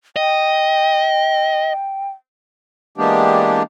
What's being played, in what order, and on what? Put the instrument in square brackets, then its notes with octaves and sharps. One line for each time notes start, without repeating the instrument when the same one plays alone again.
[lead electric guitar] D#5 [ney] G5
[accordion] E3 G#3 A#3 B3 D4 G4